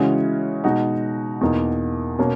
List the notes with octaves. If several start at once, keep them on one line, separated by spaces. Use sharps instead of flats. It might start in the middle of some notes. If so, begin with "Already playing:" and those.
Already playing: C#3 E3 G#3 C#4 F#4
B2 G#3 D#4 F#4
E2 B2 A#3 D#4
B2 A#3 C#4